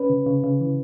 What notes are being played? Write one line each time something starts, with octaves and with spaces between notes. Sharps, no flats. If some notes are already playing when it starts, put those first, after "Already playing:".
Already playing: C#4 B4
C#3
C#3
C#3
E3